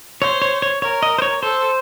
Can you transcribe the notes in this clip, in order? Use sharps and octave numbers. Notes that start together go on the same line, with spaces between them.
C5 C#5
C#5
C#5
A#4 C#5
D#5
C5
C#5
A4 C5